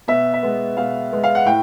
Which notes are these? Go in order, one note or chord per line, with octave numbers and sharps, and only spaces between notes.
B2 E5
E5
G#3 B3
B2 F5
G#3 B3
F5
F#5
A2 G5